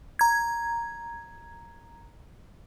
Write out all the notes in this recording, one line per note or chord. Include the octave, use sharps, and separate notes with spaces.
A#5 G#6